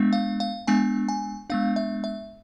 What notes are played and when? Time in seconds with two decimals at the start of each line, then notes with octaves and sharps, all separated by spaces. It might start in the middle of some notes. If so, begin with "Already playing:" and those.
Already playing: G#3 B3 D4
0.13 F5
0.40 F5
0.67 G#3 B3 D4 G#5
1.09 G#5
1.50 G#3 B3 D4 F5
1.76 E5
2.04 E5